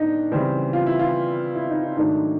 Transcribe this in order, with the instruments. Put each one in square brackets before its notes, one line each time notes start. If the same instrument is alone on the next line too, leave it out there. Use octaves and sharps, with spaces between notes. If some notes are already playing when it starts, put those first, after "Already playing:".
Already playing: [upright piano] A2 B3 D4 D#4
C#3 E3 G3 C4
F4
E4
F4
E4
D#4
D#4
G#2 D#3 F#3 A3 D4 D#4